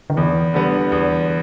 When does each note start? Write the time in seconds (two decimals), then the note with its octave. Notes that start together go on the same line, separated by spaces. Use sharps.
0.10 D3
0.17 E2 E3
0.54 D3 G3 B3
0.92 E2